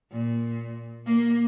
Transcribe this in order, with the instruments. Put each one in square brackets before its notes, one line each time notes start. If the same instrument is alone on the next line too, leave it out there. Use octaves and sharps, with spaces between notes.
[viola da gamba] A#2
A#3